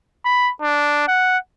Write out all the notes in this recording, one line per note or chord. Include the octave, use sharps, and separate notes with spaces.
B5
D4
F#5